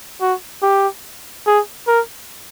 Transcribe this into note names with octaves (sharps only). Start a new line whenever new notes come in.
F#4
G4
G#4
A#4